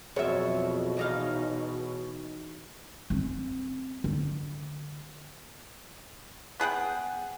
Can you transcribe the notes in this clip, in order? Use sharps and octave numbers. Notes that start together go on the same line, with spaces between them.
F2 B2 F#3 G#4 C#5 E5
E3 D#4 F5
C4 C#4
D3
B3 G#4 F#5 G5